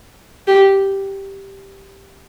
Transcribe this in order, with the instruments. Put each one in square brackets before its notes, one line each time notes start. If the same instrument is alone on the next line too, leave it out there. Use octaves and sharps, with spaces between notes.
[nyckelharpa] G4